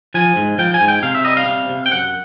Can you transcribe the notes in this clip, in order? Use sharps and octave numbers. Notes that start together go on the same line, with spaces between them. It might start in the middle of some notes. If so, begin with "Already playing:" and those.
F3 G#5
G#2
F3 G5
G#5
G#2
G5
C3 F5
E5
G3 D#5
F5
C3
C3
G5
F#2 F#5